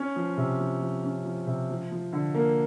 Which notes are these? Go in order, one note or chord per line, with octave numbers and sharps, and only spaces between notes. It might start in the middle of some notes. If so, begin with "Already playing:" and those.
Already playing: C#4
F3
C3
F3
F3
C#4
F3
C3
F3
F3
D3
A#3